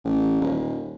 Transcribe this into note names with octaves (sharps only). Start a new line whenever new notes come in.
A1
D#1